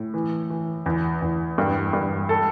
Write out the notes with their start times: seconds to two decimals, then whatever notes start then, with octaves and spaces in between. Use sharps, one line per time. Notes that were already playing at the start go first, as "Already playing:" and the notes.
Already playing: A2
0.14 E3
0.50 E3
0.86 E2
1.22 E2
1.58 G2
1.93 G2
2.29 A4